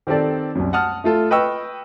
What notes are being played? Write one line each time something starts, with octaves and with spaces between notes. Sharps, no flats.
D#3 C4 G4 A4 D5
C2 F#2
F#5 A5 D#6 F6
A3 F4 A4
B4 D#5 G5 C#6 E6